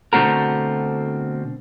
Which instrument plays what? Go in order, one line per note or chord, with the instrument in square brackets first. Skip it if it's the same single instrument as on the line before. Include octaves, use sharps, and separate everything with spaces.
[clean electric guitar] B2 D3 A3 C4 F#4 A#4